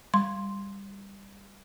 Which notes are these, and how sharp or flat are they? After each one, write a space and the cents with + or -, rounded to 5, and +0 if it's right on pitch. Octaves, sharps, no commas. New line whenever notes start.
G3 +15 C6 +0